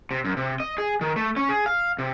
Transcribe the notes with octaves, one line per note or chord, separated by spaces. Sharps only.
C3
F#2
C3
D#5
G#4
D#3
A3
C#4
G#4
F5
C3